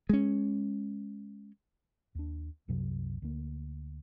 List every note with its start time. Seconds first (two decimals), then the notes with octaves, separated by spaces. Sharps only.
0.09 G#3 C#4
2.15 D#2 D4
2.68 C2 F#2 C3 F#3
3.22 D2 A#3